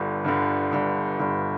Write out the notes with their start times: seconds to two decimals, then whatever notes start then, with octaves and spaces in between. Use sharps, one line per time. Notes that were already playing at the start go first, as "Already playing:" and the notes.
Already playing: G1 G2 D3
0.24 G1 G2 D3
0.72 G1 G2 D3
1.19 G1 G2 D3